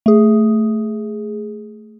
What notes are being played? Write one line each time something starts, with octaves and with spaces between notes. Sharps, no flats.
A3 G#4